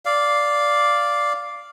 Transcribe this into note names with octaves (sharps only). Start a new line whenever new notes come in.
D5 F5